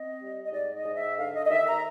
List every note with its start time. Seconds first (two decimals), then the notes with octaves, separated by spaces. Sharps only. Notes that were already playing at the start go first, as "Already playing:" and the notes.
Already playing: C4 D#5
0.19 G3
0.45 D#5
0.52 G#2 D5
0.74 D#5
0.85 G#2
0.96 E5
1.17 D3 F5
1.34 D#5
1.46 D#5
1.51 D#2 E5
1.67 A#5